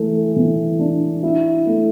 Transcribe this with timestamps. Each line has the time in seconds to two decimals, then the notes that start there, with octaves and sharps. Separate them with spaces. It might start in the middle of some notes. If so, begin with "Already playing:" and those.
Already playing: E3 A3
0.36 E3
0.79 D4
1.23 E4
1.66 A3